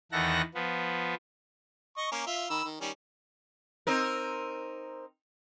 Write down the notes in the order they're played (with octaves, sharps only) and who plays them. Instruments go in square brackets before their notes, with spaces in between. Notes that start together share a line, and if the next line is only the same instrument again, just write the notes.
[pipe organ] E2 D#3 E3 A4 F#5 A#6
F3 B3
[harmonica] D#5 C#6
A#3 C#4
F4 E5
D#3 B5 E6
D#3
D#3 G3 C#4
[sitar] C4 D#4 A#4